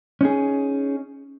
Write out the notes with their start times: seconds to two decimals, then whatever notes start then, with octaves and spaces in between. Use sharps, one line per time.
0.21 C#4 D#4 G#4